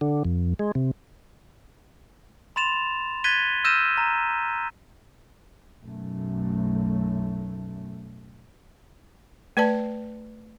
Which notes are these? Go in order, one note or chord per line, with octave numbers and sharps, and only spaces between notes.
D3
F2
G#3
C3
B5 C6 A6 E7 F7
F#6 G#6 A6 B6 D#7 G7
E6 F6 G6 A#6 D#7 E7
A#5
B1 F#2 A3
A3 B4 D5 A5